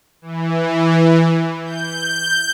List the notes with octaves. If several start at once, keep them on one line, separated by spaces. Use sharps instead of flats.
E3
G6